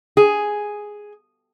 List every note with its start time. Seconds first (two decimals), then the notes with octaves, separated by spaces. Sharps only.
0.17 G#4